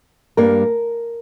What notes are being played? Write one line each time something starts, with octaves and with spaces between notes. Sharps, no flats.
G2 G3 A#3 A#4